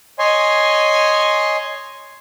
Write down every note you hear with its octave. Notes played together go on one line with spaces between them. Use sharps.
C#5 D#5 G#5 C6